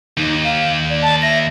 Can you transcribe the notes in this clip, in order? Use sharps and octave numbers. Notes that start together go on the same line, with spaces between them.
D#2 D#4
F5
D5
A5
E5 A#6